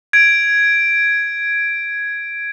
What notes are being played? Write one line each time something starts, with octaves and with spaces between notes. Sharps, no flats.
G#6 D7